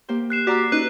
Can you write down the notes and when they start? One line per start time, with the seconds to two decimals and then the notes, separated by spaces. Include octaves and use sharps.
0.09 A#3 G4 C5
0.30 F#6 C7 E7
0.47 F#4 G4 D5 A#5 E6
0.72 C#4 D#4 B4